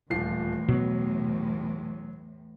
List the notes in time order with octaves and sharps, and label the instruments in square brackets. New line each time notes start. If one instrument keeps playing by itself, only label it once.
[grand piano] D#1 F3 C7 [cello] E2 A2
[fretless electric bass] B2 [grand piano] F#3